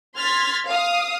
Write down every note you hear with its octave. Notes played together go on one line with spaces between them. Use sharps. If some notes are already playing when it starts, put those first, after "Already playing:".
C6 F6 G#6 A6 B6
F5 D#6